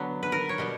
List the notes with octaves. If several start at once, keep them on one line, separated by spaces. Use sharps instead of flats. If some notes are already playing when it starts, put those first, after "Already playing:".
Already playing: D3 F#3 B3
B4
A#4
C#5
B2 G3 B3